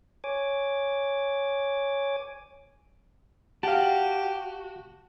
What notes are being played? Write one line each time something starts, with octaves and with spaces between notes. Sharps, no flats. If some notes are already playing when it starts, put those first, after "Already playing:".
C#5 G#5 D6
F#4 G4 F5 A5